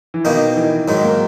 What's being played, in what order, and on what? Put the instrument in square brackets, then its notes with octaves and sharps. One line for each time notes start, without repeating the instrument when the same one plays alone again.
[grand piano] E3
[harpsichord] B2 A#3 D#4 [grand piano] D#3
[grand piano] E3
[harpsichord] G#2 D#3 G#3 [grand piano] F#3
[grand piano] A#3